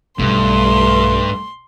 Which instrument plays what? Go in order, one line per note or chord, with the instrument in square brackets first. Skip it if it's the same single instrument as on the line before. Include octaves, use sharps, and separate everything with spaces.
[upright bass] B1 [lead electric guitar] G2 [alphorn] A3 [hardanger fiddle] C6